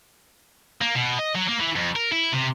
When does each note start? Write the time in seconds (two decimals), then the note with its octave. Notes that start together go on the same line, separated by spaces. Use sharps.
0.81 A#3
0.95 B2
1.19 D#5
1.35 F#3
1.49 A#3
1.61 E3
1.76 F2
1.96 A#4
2.12 E4
2.33 C3